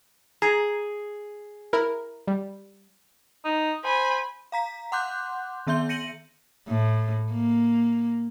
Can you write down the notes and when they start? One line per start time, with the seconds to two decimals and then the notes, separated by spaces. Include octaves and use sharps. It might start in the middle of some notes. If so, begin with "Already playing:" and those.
0.42 G#4 A#5
1.73 E4 A#4
2.27 G3
3.45 D#4
3.84 C5 G#5 B5
4.52 F5 A#5 B6
4.92 F#5 C6 D6 F#6 G6
5.67 D#3 B3 E5 C6 G6 G7
5.89 A#6 C#7 D#7 F#7
6.67 A2
7.32 A#3